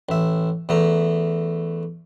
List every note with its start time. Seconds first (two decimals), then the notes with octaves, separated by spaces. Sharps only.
0.09 A1 E5
0.69 E2 A3 A#5